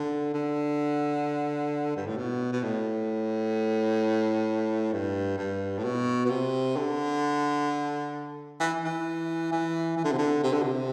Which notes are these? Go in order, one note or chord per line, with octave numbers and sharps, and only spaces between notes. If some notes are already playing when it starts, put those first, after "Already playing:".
Already playing: D3
D3
G2
A2
B2
B2
A2
G2
G2
A2
B2
B2
C3
D3
E3
E3
E3
E3
D3
C3
D3
C3
D3
C3